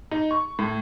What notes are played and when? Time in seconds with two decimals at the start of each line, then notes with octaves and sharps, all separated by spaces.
0.11 D#4
0.31 C#6
0.59 A2